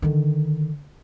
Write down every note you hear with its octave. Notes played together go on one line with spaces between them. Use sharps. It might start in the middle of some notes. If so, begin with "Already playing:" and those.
D3 D#3